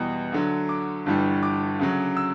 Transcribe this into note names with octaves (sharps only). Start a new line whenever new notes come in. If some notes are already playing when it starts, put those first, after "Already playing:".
Already playing: E2 B2 G3
D2 D3 F#3
D6
G1 G2 E3 G3
D6
D2 C#3 F#3
E6